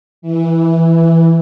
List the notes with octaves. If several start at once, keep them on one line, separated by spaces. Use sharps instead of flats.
E3